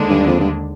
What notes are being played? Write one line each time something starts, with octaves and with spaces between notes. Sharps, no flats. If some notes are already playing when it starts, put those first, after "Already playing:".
Already playing: D#2 D3 G#3 D4
G2
F2
G2